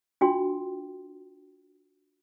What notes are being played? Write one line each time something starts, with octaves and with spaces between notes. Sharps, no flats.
D4 F4 F#4 G5 C6